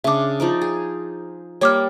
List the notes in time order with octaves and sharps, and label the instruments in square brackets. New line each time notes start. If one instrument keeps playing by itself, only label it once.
[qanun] C#3 D4 [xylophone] E5 D6
[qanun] F3 D#4 D5
G#4
[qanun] G3 A#3 G5 [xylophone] C#5 D6 F6